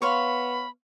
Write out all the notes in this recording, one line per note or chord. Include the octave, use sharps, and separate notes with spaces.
B3 C#5 F5 B5 C6